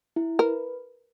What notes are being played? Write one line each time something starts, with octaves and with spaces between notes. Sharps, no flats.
E4
A#4 B4